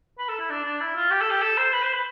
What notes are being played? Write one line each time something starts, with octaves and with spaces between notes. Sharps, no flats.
B4
A4
E4
D4
D4
E4
F4
G4
A4
G4
A4
C5
B4
C5
B4